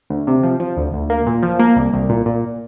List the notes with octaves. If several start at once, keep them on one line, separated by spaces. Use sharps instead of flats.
D2
C3
F3
F3
D2
D2
A#3
A#2
F3
A#3
C2
C2
A#2
A#2